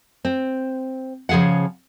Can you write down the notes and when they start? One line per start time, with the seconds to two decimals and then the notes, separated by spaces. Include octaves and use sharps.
0.25 C4
1.29 C#3 F3 G#4 F5 F#5